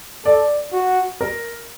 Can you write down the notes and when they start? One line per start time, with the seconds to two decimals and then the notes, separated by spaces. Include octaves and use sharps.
0.25 A4 D5
0.73 F#4
1.21 A#4